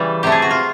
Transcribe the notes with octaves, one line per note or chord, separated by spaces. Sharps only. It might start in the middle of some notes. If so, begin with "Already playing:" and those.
Already playing: C#3 E3 G3
C3 E3 A3 G4
G#4
F#4
F4